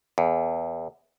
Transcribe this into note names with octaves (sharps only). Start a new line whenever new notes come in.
E2